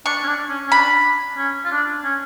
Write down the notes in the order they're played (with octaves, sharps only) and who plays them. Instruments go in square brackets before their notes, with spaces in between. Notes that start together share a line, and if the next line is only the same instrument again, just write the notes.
[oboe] D4 [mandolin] C#6
[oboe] C#4
D4
C#4
C#4
[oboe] D4 [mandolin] B5
[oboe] C#4
F4
D4
C#4